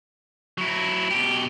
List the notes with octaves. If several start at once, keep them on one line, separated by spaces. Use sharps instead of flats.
F#3 E4
B2 G4